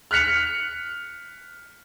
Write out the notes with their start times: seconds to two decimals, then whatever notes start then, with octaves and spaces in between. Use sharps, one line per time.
0.11 F6 F#6 B6 C#7 F7